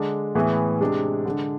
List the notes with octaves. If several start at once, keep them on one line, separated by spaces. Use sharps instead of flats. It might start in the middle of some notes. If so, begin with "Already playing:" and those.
Already playing: D3 G#3 D4
A2 E3 B3 E4 G#4
C3 G#3 D4
D3 G#3 D4